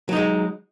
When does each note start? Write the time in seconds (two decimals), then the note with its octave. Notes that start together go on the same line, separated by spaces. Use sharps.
0.09 F#3
0.13 D#4
0.16 G#3